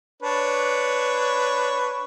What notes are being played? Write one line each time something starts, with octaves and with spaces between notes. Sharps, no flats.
D4 B4 C#5